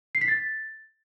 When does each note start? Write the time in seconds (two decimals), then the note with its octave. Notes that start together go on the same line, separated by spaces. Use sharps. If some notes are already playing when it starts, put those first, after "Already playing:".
0.15 C7
0.21 B6
0.28 A6